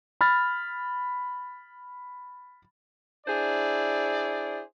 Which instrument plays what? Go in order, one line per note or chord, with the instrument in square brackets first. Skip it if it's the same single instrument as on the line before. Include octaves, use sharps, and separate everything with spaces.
[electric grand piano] B5 F6 A6
[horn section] D4 E4 G#4 C5 D5